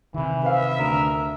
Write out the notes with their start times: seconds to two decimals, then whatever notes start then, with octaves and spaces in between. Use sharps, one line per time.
0.14 C3 D#3 E3 E4
0.43 B4 C5 E5 F5
0.78 D2 A#4